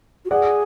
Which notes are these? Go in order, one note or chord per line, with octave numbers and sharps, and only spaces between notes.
F#4
G#4 D5 F#5